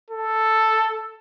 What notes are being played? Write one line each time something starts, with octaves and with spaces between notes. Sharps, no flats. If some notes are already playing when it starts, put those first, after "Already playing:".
A4